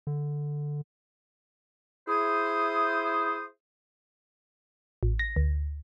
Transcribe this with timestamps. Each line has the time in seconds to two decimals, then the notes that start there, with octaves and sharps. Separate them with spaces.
0.07 D3
2.08 E4 G#4 C5 D#6
5.03 A1
5.19 A#6
5.36 D2